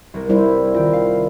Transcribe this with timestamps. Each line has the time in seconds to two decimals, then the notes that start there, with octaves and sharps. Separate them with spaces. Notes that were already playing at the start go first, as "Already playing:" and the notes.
0.14 C2 A#4
0.29 G3 E4 C5
0.74 D#3 F4 G5 A#6
0.93 F5